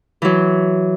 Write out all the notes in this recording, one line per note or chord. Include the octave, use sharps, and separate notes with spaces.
E3 F#3